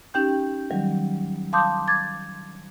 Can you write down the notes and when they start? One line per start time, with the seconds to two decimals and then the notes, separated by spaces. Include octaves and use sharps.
0.14 C#4 D#4 G4 G5 G6
0.71 D#3 F#3 G3
1.53 F5 A5 C6 D6 D#6 G6
1.88 D6 G#6 A6